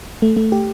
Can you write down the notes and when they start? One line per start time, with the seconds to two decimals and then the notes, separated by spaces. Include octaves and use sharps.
0.22 A3
0.36 A3
0.52 G4